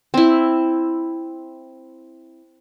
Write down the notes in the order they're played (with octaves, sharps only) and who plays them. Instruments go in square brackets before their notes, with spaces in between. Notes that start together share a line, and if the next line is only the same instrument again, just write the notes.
[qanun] C4 E4